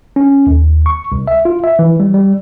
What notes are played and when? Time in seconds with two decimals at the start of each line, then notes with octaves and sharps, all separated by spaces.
0.16 C#4
0.47 D#2
0.86 C#6
1.12 C2
1.28 E5
1.45 F4
1.64 E5
1.79 E3
2.00 G3
2.14 G3